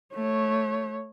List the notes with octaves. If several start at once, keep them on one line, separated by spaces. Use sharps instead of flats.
A3 C#5